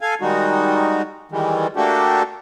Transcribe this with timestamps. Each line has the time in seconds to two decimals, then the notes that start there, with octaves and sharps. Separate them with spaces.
0.01 A4 F5 G#5
0.21 D#3 G3 G#3 D#4 F#4
1.32 D#3 E3 G3 G#3
1.76 A3 A#3 D4 F#4 G4 A4